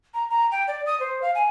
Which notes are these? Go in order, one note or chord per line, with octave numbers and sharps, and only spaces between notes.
A#5
A#5
G5
D5
D#6
C5
F5
G#5